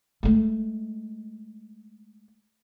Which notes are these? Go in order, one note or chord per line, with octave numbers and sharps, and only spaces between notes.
G#3 A3